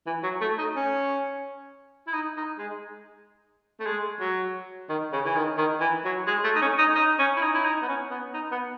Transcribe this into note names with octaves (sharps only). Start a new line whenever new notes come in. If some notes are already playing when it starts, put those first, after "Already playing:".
E3
F#3
A3
D#4
C#4
E4
D#4
D#4
G#3
A3
G#3
F#3
D#3
C#3
E3
D#3
D#3
E3
F#3
G#3
A3
D#4
C#4
D#4
D#4
C#4
E4
D#4
E4
D#4
B3
C#4
B3
D#4
B3